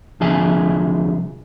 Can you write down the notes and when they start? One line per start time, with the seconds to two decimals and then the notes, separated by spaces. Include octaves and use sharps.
0.20 C2 D3 F3 G#4 E5 G#5